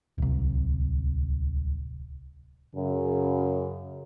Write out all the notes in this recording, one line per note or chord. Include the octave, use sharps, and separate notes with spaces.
D1 C2
F#2 C#3